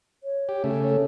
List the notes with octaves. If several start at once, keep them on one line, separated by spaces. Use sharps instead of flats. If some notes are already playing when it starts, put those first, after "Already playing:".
C#5
G4
C#3 A3
A4